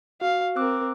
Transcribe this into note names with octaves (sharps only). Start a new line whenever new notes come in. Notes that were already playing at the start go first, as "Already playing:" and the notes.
F#4 F5
C4 A#4 D6 E6 F#6